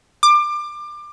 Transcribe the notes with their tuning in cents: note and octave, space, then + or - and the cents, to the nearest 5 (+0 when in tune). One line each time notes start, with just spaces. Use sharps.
D6 +25